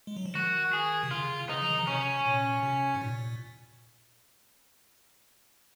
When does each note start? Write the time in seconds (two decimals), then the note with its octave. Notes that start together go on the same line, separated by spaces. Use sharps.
0.07 G#3
0.16 F#3
0.26 F3
0.35 D#3 F#4
0.73 G#4
1.03 C3
1.11 C#3 F4
1.49 C#3 D#4
1.62 F3
1.70 D#3
1.78 C#3
1.87 C3 C#4
2.26 A#2
2.63 C3
2.94 G#2
3.01 A#2